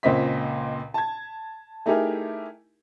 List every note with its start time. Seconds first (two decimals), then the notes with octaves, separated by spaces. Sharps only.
0.03 C#2 A#2 C4 D#5 B6
0.94 A5 G#6
1.86 A3 D#4 E4 G4 G#4 A#4